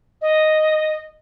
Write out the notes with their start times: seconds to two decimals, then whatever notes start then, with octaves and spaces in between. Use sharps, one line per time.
0.21 D#5